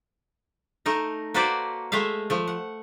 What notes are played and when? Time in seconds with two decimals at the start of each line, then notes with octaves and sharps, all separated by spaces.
0.86 A3 D#4 A#4
1.34 A#3 F#4 A4 B4 C5 D5
1.92 G#3 A3 E5 F5
2.30 F3 A3
2.47 F#5